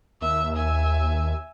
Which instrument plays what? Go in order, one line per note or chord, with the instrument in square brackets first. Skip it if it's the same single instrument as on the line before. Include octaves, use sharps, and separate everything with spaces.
[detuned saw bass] D#2 [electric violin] E5
[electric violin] E5 G#5